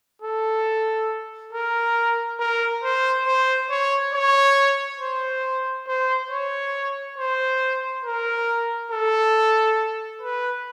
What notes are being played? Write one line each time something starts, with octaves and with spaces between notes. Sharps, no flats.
A4
A#4
A#4
C5
C5
C#5
C#5
C5
C5
C#5
C5
A#4
A4
B4